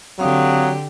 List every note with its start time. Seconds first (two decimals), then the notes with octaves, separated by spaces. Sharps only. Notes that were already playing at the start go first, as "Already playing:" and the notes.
0.19 D3 F#3 C4 G4 F5 D#6